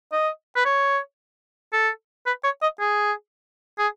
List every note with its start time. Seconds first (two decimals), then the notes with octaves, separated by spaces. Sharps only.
0.13 D#5
0.56 B4
0.66 C#5
1.73 A4
2.27 B4
2.44 C#5
2.62 D#5
2.80 G#4
3.79 G#4